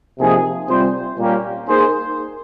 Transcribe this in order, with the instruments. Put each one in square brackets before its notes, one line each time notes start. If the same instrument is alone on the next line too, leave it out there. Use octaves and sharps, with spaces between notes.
[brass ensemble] C3 F3 A#3 D#4 G#4
C3 G3 C4 F4 C5
A#2 G3 A#3 C#4 G4
A#3 D#4 G#4 C5